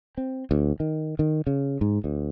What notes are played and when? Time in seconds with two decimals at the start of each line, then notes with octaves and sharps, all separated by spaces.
0.18 C4
0.51 D2
0.80 D#3
1.19 D#3
1.47 C#3
1.81 G#2
2.04 D2